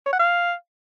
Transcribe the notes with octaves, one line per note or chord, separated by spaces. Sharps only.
C#5
F#5
F5